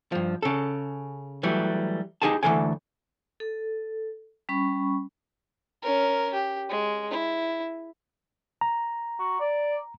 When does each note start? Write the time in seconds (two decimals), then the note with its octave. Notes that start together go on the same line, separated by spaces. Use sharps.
0.12 G2 F3
0.42 C#3 A4
1.43 E3 F#3 G3 A3
2.22 D#4 E4 G4 G#4 G#5 A5
2.43 D2 G2 E3 A4 D5 G#5
3.40 A4
4.49 G3 C#4 B5 C#6
5.82 C#4 A#4
6.33 G4
6.69 G#3
7.10 E4
8.61 A#5
9.19 F#4
9.40 D5